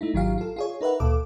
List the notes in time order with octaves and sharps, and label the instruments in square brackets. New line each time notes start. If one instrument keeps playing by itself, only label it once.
[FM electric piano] A3 D#4 E4
G#1 D#3 F#3 F4 G4 F5
F4 A4
F4 G#4 C#5
D#4 A#4 B4 E5 F#5
D2 A#2 A4 D6